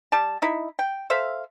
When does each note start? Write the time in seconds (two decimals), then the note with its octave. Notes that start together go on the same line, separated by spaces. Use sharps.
0.12 G3 G4 A5
0.42 D#4 E4
0.79 G5
1.10 A4 C5 E5 F5